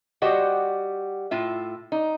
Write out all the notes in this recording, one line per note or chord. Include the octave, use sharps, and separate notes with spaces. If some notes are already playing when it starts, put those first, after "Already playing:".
G3 F#4 G4 C5 D#5 F#5
A2 F4 E5
D#4